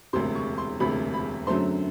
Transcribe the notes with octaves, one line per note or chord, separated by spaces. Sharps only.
E1 D2 C3 C6
C#6
C6
E1 D2 C3 B5
B5
F#2 D3 F#3 A3 C4 C6